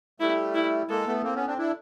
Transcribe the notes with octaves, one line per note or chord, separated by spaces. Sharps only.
G3 A3 E4
E4
G#3 A#3 A4
A3 B3
A#3 C4
B3 C#4
C4 D4
D4 E4